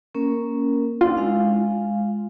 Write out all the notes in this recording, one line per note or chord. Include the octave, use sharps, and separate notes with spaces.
A#3 C#4 A#4
D4 E4 F4 D5
G#3 F5